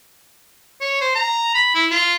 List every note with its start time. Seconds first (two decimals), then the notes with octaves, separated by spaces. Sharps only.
0.81 C#5
1.01 C5
1.15 A#5
1.55 B5
1.75 E4
1.91 F4